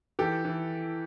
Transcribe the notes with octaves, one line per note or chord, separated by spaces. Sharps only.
E3 G4 A4
E3